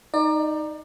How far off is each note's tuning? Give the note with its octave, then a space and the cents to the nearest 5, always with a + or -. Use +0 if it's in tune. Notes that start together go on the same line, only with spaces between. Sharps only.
D#4 +0 D5 +30